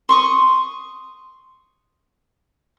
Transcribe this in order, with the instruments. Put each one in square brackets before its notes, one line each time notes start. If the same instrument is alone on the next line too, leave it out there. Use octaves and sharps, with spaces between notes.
[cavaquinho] C6 C#6 D#6